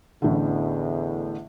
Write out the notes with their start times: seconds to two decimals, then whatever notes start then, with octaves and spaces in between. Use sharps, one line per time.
0.22 A1 E2 A2 D3